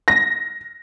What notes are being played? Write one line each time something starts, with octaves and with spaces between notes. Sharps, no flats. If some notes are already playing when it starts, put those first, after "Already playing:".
A#6